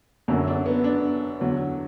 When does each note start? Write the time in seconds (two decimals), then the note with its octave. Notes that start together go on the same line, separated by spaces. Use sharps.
0.28 F#1 F#2 D3 F#3
0.47 D4
0.66 B3
0.84 D4
1.40 E2 D3 F#3